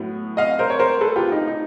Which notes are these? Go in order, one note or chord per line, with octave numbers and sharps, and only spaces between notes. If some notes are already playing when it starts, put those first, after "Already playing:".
Already playing: A2 F#3 B3
D#5 F5
A#4 C5
C#5
A#4 C5
A4 B4
F4 G4
D#4
D#4